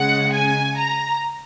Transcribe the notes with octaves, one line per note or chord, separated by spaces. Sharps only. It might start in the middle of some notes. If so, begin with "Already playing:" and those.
Already playing: C#3 G#3 F#5
G#5
A#5